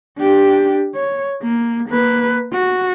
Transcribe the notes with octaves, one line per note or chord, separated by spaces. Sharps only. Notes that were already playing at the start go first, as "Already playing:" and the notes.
D4 G4
C#5
A#3
A#3 B4
F#4